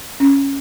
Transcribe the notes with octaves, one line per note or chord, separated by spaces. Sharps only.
C#4